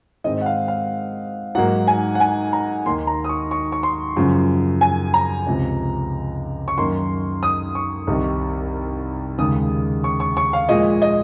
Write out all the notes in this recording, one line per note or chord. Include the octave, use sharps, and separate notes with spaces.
G#2 D#3 G#3 C4 D#5
F#5
F5
F5
G#2 F#3 A#3 F#5
G#5
F#5
G#5
A#5
D#2 D#3 A#3 C6
A#5
D#6
C#6
C#6
C#6
C6
F#2 C#3 F3
G#5
A#5
C#2 C3 F3
C#6
F#2 D#3 A#3 C6
D#6
C#6
C2 C3 D#3
D#2 C#3 G#3 D#6
C#6
C#6
C#6
F5
A#2 F3 G#3 D#5
D#5